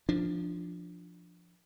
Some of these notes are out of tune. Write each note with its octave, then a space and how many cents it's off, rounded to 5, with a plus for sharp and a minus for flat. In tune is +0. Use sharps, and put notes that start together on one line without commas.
F3 +0 D4 +5